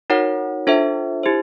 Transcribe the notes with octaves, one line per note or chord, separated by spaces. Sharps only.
D#4 F#4 A#4 C#5 F#5
D4 F4 A4 C5 E5
E4 G4 C5